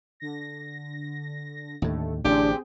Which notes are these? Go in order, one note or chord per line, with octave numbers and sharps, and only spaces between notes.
D3 A#6
D#2 A2 D3 A3
A1 D3 C4 D4 G4 G#4 G5